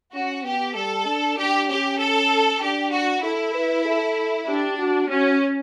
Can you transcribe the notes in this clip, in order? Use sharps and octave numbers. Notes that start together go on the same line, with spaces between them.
C#4 F#4
B3 G4
G3 A4
D4
D4 G4
C#4 G4
A4
D4 G4
F#4
E4 A4
B4
A4
D4 G4
F#4
C#4 F#4